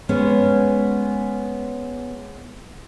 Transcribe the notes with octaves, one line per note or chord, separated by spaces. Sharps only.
G#3 B3 C#4